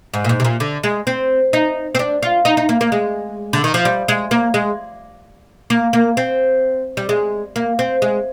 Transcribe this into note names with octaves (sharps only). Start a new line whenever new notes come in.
G#2
A#2
G#2
C3
A#2
D3
G#3
C4
D#4
C4
D4
F4
D#4
D#4
A#3
A#3
G#3
D3
D#3
F3
G3
G#3
A#3
G#3
A#3
A#3
C4
G3
G#3
A#3
C4
G#3